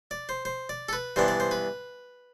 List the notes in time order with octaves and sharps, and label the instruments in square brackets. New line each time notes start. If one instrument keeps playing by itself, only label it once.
[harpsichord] D5
C5
C5
D5
A4
B4
G2 E3 B3 D4 C5
D5
C5
B4